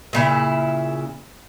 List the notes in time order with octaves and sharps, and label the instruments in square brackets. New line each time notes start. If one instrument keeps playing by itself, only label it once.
[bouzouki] A#2 C#3 E4